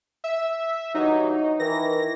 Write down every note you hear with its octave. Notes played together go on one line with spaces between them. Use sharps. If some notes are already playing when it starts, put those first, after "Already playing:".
E5
G2 E3 F#3 D#4
D#3 E3 A#6